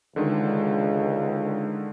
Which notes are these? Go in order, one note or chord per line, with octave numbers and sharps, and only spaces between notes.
C#2 D3 D#3 G#3